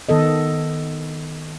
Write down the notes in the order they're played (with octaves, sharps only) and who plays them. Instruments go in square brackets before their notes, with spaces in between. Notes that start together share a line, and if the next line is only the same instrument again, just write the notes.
[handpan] D#3 B3 A4 D#5